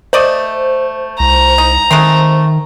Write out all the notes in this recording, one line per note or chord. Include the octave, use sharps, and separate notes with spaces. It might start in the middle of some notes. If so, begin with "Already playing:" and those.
A3 C5 D5 D#5
C2 A#5
D#4
D#3 G#3 A3 C4